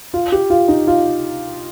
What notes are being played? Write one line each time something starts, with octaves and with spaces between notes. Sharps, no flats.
F4
G4
F4
D#4
F4